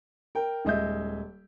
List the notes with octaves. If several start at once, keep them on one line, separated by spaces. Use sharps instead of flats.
A#4 G5
D#1 G#3 D#5 E5 G6